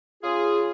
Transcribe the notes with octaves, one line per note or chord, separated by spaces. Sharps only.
C#3 F4 G#4